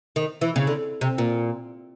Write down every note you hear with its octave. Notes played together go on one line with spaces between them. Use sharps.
D#3
E3
C#3
D3
C3
A#2